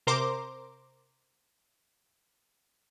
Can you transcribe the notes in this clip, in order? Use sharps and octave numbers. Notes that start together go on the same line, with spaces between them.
C3 A#4 C5 A#5 C6 D6